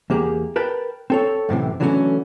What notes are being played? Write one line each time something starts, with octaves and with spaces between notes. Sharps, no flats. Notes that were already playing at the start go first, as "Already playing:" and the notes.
E2 A#3 G4 G#4
A#4 B4 G5 A5
C4 A4 C#5
F#2 A2 C3 E3
D3 E3 F#3 A3 B3 C#4